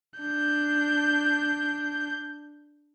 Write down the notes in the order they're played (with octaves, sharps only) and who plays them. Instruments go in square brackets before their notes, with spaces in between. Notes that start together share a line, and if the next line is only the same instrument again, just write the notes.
[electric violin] D4 G6